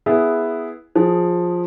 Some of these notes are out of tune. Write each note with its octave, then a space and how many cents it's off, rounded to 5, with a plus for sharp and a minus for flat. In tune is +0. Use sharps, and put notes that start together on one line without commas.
B3 +0 E4 +0 G#4 +0
F3 +10 G#4 +0